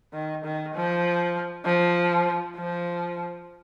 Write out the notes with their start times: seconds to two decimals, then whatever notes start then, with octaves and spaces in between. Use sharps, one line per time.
0.13 D#3
0.44 D#3
0.74 F3
1.65 F3
2.56 F3